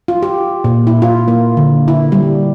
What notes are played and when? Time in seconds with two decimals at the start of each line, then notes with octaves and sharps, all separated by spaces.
0.08 F4
0.23 G4
0.64 A#2
0.87 E4
1.02 F4
1.28 A#3
1.57 D3
1.88 E4
2.12 G3